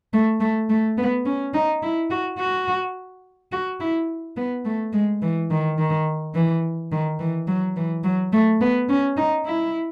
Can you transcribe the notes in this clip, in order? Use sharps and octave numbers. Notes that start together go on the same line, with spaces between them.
A3
A3
A3
B3
C#4
D#4
E4
F#4
F#4
F#4
E4
B3
A3
G#3
E3
D#3
D#3
E3
D#3
E3
F#3
E3
F#3
A3
B3
C#4
D#4
E4